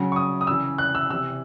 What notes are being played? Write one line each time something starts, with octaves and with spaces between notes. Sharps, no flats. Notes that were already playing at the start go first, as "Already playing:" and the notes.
Already playing: C#3 F#3
C#6
D#6
D#6
C#3 E3 E6
F#6
E6
C3 E3 E6